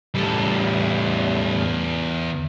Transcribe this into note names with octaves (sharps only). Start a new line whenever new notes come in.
E2 A2 G3 A4